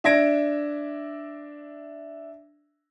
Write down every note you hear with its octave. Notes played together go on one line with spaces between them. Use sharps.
D4 E5 G#6 A#6 D7